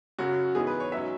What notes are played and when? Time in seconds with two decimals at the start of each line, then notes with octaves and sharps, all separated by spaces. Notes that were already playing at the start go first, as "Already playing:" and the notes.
0.18 F#2 C#3 F#3 C#4 F#4
0.55 G#2 E3 B3 G#4
0.67 B4
0.80 C#5
0.92 G#2 F#3 C#4 E5